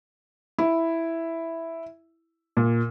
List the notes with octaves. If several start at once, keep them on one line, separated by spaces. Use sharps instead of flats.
E4
A#2